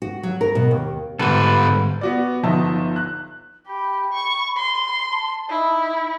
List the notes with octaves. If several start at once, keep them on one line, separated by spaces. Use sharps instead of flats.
F#4
F#3
A#4
B2
D#2
G#2 D3 G3 B3 A4 B4 C5
B3 F#4 D5
G1 F3 B3 D#4 E5 A5
F#6
G4 B5
C#6
C6
A5
D#4 E4